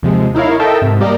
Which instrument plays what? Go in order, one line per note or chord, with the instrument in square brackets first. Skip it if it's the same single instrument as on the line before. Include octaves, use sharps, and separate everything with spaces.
[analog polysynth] D#2 C3 F3 G#3
D#4 E4 A#4 C#5 F5
A4 A#4 D#5 E5 G5 A5
G#2 C3
G3 A#3 G4 A#4 D5 D#5